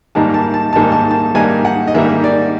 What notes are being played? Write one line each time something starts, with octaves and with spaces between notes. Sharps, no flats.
G#2 D#3 G3 A#3 D#4 A5
A5
A5
G#2 D#3 G3 A#3 D#4 A5
A5
A5
G#2 D#3 G3 A#3 D#4 G#5
F#5
D#5
G#2 D#3 G3 A#3 D#4 E5
D5